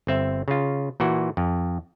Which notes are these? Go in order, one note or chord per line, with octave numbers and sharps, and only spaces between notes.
G1 C4 E5
C#3 F4
A#2 E3 F#4
F2